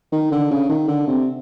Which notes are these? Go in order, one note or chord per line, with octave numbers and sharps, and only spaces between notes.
D#3
D3
C#3
D#3
D3
C3